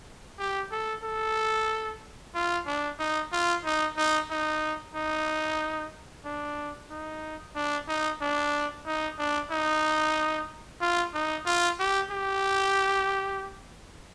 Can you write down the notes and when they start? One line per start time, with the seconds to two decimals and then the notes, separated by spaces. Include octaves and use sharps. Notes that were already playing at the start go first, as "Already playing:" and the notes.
0.39 G4
0.71 A4
1.04 A4
2.35 F4
2.67 D4
2.99 D#4
3.32 F4
3.65 D#4
3.97 D#4
4.30 D#4
4.95 D#4
6.25 D4
6.90 D#4
7.56 D4
7.88 D#4
8.21 D4
8.86 D#4
9.19 D4
9.51 D#4
10.81 F4
11.14 D#4
11.46 F4
11.79 G4
12.11 G4